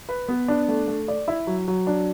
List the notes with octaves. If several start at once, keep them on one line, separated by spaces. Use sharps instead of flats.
B4
B3
D4
A3
A3
D5
E4
F#3
F#3
D4